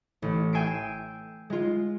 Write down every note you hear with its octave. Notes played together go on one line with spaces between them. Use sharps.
A1
G5 G#5 E6 C7 D7
G#3 F4